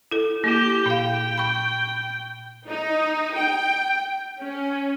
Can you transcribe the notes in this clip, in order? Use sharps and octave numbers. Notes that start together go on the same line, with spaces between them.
E4 A4
A#3 E4 G4 G6
A#2 F5 G5
B5 C#6
D#4
G5
C#4